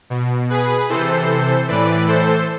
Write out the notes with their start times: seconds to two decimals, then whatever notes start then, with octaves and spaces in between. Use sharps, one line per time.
0.10 B2
0.50 G#4 B4
0.89 C3 E3 A4 C5
1.68 A2 E3 B4 D5
2.08 A4 C5